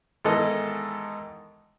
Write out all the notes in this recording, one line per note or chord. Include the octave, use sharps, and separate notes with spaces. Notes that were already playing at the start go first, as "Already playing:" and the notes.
G#2 D#3 E3 B3 A4 D#5